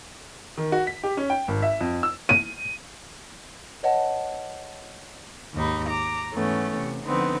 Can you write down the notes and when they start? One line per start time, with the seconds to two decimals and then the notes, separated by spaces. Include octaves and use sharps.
0.58 D#3
0.72 F#4
0.87 B6
1.03 G4
1.17 C#4
1.30 G5
1.48 G#1
1.62 E5
1.81 F2
2.03 E6
2.29 D#7
3.83 B4 C#5 D#5 F#5 A5
5.54 D#2 G#2 D#4 B5
5.89 A#5 D6
6.32 G#2 E3 A3 B3 C#4
6.77 C3
7.05 D3 F3 B3 C4 D#4 B4